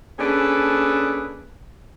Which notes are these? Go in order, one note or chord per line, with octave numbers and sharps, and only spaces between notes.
A#3 C#4 D4 G#4 A4 B4